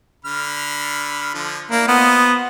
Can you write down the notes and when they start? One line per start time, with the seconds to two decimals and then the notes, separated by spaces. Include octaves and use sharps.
0.25 D3 B5 F6
1.34 D3 F3
1.71 A#3 D4 E4
1.88 B3 F4 C5 D#5